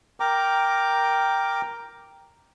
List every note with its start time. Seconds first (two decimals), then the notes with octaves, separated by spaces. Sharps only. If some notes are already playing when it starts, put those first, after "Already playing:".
0.20 A#4 G5 A#5 D6